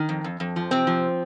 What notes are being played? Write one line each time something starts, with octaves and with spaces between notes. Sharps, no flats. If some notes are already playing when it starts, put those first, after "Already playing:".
Already playing: D#3
F2
F2
F2
F3
C3 C4
F3